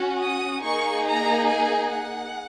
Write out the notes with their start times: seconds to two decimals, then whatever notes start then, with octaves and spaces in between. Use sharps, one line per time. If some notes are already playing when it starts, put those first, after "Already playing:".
Already playing: C#4 F#4
0.21 D#6
0.63 A#3 D#4 G#4 C#6
1.06 A#5
1.48 G#5
1.90 F#5